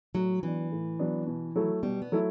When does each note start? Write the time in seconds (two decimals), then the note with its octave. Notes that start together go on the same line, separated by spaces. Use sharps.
0.14 A2 F#3
0.43 E3 F#3 B3 D4
0.72 A2
0.99 F#3 B3 D4
1.27 B2
1.56 F#3 A3 E4 A4
1.83 B2 G3
2.02 B3
2.12 F#3 A3 E4 A4